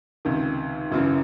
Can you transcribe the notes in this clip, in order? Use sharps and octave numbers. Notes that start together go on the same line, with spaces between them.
C#2 C3 D#3
G#1 F#2 C#3 E3